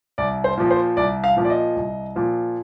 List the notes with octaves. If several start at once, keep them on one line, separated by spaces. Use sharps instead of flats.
C2 D5
C5
A#2 F3
C5
C2 D5
F5
A#2 F3
D5
D#5
C2
A#2 F3